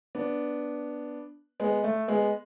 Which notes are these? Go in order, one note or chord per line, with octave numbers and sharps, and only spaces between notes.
B3 D4
G#3 B3
A3
G#3 B3